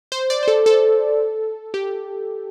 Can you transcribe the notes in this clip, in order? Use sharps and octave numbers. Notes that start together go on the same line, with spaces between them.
C5
D5
C5
A4
A4
G4